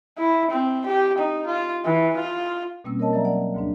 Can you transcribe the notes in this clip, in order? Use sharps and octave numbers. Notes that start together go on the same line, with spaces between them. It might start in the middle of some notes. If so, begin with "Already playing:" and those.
E4
C4
G4
D#4
F4
E3
F4
B2 G3 A#3 C4 C#4 E6
A#4 C#5 D#5 A5
F#3 D5 E5 A#5
D5 F#5
D2 G#2 D4